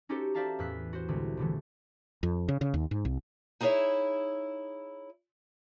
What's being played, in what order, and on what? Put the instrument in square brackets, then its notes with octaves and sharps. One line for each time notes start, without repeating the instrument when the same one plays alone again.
[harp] C#4 D#4 F#4 G4 A4 C5
C5 D5 E5 F5 A5 A#5
E2 A2 E6 F#6 B6 C7
F#4 C5
C2 A2 D3 G#3
E1 A2 D3 E3 A3
[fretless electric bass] F2
C#3
C#3
D#2
G#2
C2
[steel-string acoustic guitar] D#4 E4 G#4 A#4 C#5 E5